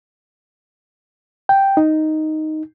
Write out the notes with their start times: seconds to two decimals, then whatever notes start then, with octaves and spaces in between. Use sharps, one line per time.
1.49 G5
1.77 D#4